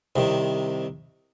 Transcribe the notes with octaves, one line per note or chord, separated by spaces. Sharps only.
C2 C3 D#3